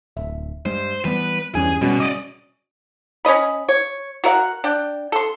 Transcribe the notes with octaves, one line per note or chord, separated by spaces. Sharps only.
D1 E5
G2 G#3 C5
E3 G3 B3 B4
E2 G2 E3 C#4 E4 G#4 G#5
B2 G3 C#4 F#4 D#5
D5 D#5 D6 D#6
C#4 D4 D#5 B5
C#5
F#4 A#4 E5 F#5
D4 G5
A4 C6